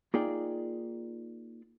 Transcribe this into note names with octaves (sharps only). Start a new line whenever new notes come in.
A#3 D#4 F4 G#4 D5 G5